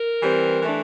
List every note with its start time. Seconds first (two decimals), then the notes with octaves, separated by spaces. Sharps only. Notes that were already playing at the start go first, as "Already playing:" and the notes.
Already playing: A#4
0.23 E3 G3 C4
0.62 E3 A3 D4